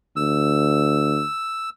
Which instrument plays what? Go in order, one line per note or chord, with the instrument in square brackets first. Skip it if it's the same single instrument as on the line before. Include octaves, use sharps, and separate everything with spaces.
[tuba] D2 [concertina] E6